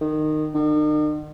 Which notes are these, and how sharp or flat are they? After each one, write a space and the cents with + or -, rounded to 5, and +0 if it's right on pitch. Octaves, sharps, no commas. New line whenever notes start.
D#3 -20
D#3 -45